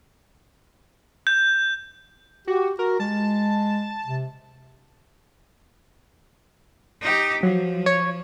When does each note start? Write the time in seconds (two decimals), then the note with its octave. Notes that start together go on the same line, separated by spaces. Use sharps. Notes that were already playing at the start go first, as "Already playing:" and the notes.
1.27 G6
2.47 F#4 G4
2.79 F#4 A#4
3.00 G#3 A5
4.06 C3
7.01 D#4 G4
7.43 F3 F#3
7.86 C#5